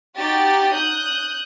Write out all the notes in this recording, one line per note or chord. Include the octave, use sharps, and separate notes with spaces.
D#4 F#4 G4 D6 A6
D#6 F#6 G6